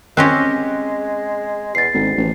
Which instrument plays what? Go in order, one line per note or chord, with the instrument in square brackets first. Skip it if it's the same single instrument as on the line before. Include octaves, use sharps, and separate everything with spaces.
[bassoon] G#3 [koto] C4 C#4 G4 [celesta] F#6 A#6
[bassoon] E2 [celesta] A6 C7
[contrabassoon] G#1 [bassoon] D2
[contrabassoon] A1